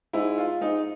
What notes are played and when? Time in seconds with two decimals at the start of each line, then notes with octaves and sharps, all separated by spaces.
0.13 G#2 E4
0.38 F4
0.61 G#2 D#4